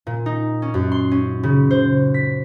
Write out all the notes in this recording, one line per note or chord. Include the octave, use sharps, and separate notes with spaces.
A#2
D#4
C#4
F#2
C6
C#4
C#3
C5
B6